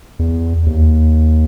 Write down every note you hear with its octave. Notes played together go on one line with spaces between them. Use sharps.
E2
D#2